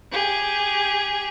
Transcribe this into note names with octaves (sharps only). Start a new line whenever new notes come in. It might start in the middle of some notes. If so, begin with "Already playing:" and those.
G4 G#4